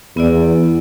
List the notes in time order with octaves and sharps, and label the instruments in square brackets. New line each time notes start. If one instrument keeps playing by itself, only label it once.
[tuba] E2 [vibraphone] B3 E4 D5